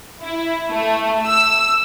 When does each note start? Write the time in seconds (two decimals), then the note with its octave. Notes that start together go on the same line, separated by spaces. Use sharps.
0.21 E4
0.70 A3
1.27 E6